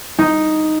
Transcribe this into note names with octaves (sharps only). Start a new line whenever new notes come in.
D#4